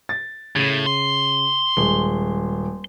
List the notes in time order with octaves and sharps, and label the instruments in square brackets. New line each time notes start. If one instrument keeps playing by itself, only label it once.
[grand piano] A6
[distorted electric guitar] A2 [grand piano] C#3 D#7
[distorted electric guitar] C6
[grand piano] D#1 G#3 G7